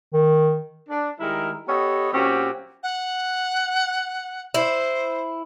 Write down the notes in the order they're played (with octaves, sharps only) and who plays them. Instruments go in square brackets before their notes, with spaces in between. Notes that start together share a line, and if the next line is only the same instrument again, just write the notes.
[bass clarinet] D#3
[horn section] D4
D#3 G3 G#3 E4 A#4
B3 G4 A4 C#5 D#5
A#2 F#3 C4 C#4 F#4 G4
[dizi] F#5
[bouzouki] E4 [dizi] C5